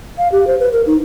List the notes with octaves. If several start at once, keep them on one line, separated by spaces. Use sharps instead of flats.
F5
G4
C5
B4
A#4
D#4